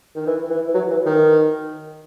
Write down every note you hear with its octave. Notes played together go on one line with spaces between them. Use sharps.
D#3
E3
E3
E3
F#3
E3
D#3